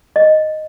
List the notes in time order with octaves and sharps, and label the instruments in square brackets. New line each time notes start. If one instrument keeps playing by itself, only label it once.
[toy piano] D#5